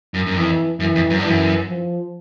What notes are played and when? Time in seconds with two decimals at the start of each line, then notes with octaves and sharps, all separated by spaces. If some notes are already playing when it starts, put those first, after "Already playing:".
0.14 F#2
0.26 F#2
0.37 F2 E3
0.80 F#2 E3
0.95 F2
1.10 F#2
1.19 G2
1.24 F#2 E3
1.69 F3